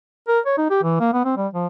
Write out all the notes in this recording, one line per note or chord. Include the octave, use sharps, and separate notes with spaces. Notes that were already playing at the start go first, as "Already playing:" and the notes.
A#4
C#5
D#4
G4
E3
A#3
B3
C4
G3
F3